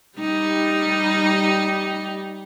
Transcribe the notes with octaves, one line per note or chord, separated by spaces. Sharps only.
G3 D#4 G4